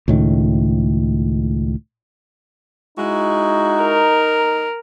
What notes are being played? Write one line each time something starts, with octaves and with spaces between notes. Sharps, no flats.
C#2 A2 D#3
G#3 D#4 E4 F#4
A#4